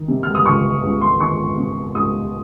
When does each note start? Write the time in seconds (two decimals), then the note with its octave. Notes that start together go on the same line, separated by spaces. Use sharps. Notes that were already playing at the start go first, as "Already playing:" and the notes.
Already playing: D#3
0.08 C3
0.23 F6
0.35 D#6
0.45 C#2 C#6
0.83 C#2
1.01 C6
1.20 D#3 C#6
1.57 C3
1.95 C#2 D#6